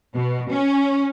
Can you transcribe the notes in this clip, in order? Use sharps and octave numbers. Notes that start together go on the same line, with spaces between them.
B2
C#4